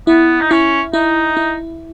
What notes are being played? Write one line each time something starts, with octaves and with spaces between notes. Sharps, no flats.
B3 E4
D#4
C#4 E4
D#4 E4
E4